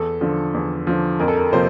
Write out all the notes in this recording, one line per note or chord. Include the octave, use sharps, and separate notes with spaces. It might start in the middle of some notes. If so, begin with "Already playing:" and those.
Already playing: E2 A4
D3 F3
E2
D3 F3
F2 A#4
A4
A#4
C3 F3 A#3 C5